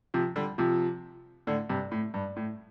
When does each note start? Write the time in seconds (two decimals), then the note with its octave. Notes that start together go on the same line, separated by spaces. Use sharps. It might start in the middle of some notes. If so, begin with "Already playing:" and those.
0.14 C3 F3
0.36 D3 G3
0.58 C3 F3
1.47 A2 D3
1.69 G2 C3
1.92 A2
2.14 G2
2.36 A2